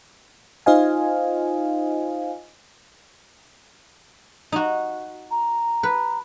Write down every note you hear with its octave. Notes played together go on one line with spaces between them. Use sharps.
D#4 F4 C5 D#5 F5 G#5
D#4 F#4
A#5
B4